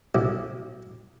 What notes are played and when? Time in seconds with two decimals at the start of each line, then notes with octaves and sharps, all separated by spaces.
0.15 B1